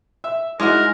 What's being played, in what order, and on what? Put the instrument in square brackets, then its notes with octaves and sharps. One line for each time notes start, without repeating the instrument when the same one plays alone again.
[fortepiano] E5
[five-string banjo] G#3 F#4 [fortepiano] D#4 E4 D6 [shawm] A#4